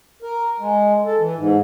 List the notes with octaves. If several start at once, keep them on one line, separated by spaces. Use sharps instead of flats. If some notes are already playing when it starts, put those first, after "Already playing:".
A#4
G#3
A4
E3
G#2